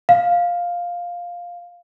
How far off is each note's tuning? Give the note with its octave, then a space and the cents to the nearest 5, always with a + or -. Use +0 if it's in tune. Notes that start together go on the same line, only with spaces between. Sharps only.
F5 +5